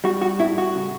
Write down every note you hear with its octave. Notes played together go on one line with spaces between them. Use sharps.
G3 F#4
F#4
A2 E4
F#4
C#3